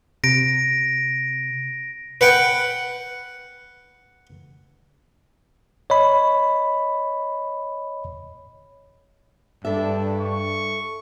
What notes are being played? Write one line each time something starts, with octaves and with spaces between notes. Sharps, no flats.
C3 A#6 D7
B4 F#5 G5
C#5 D#5 B5
G2 D4 A4 E5
C#6